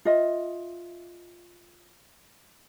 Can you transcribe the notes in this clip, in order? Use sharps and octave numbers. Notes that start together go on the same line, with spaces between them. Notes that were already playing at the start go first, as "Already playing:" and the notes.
F4 D#5 E5